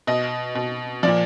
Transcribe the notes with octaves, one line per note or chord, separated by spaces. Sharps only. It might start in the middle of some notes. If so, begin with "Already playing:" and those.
B2 D#5
B2
A#2 F3 D5